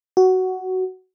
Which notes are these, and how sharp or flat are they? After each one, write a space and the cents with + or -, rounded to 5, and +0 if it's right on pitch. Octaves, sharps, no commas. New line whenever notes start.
F#4 +10